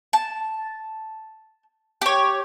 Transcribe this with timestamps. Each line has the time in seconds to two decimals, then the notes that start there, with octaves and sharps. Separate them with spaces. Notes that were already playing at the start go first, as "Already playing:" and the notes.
0.13 A5
2.02 G4 C#5